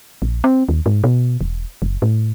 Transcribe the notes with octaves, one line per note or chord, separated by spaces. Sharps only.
A#1
C4
D#2
G#2
B2
E1
F#1
A2